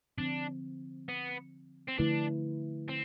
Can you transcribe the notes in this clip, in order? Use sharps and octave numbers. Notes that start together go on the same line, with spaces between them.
D3 F3 C4 D4
B3
C4
D3 F3 A3 D4 E4 B4
C4